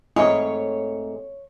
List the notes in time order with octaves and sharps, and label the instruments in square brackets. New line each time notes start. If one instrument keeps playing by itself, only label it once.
[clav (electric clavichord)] G#2 [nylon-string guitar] A3 C4 [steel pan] E4 D#5 [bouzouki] C#5